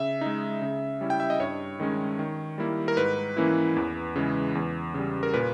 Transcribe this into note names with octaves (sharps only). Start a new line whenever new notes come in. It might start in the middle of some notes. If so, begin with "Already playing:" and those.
Already playing: C#3 E5
G#3 D#4
C#3
G3 C#4 E4
G5
E5
D#5
G2 C#5
D#3 G#3 C#4
D#3
G3 A#3 E4
A#4
G#2 B4
E3 A#3 C#4 E4
E2
C#3 E3 G#3
E2
C#3 G3
A#4
A#2 B4